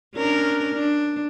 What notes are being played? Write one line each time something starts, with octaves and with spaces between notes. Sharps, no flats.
C#4 D4 A#4
D4